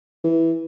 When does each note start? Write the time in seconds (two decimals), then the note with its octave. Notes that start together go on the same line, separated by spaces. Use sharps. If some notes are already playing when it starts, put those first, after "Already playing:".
0.24 E3